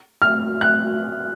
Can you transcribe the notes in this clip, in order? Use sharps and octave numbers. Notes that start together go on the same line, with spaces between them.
F6
F#6